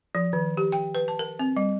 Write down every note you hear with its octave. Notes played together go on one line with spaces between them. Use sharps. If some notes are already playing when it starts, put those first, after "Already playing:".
F3
D#3
G4
G5
B4
A5
A#4
C4
G3